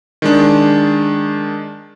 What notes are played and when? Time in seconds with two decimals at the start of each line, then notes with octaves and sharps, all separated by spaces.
0.22 D#3 G#3 D4